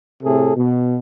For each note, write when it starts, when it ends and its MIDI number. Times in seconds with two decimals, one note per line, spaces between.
0.24 0.54 45
0.24 0.54 48
0.24 0.54 68
0.24 0.54 69
0.55 0.97 47